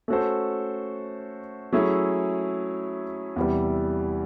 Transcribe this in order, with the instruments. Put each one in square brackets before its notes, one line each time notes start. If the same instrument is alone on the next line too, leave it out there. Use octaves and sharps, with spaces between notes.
[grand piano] A3 C#4 F#4 A4 C5
F#3 A3 C#4 E4 G#4
E2 C3 E3 G3